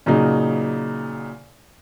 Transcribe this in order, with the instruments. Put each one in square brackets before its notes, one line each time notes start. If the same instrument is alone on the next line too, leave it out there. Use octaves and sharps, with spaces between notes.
[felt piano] A#2 C#3 F#3 D#4